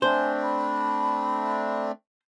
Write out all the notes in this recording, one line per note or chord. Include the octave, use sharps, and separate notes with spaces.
A3 C4 D4 C5 G#5
B5